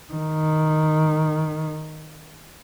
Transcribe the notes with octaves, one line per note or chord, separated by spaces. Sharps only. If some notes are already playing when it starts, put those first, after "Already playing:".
D#3